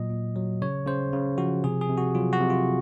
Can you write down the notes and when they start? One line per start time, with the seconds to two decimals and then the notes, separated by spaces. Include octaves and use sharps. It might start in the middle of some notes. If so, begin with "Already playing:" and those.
Already playing: A#2 F#3 D#5
0.10 A#2
0.36 F#3
0.62 C#3 C#5
0.87 C#3 C5
1.13 C#3
1.38 F3 F#4
1.64 C3 G#4
1.81 G#4
1.90 C3
1.98 F#4
2.15 F#3 F4
2.33 F#4
2.40 C3
2.50 F4